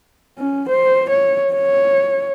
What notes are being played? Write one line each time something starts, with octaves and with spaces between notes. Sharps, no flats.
C#4
C5
C#5
C#5